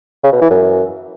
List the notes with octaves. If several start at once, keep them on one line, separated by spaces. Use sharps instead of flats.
C#3
B2
E3
F#2